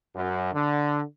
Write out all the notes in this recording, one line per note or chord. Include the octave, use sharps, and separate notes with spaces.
F#2
D3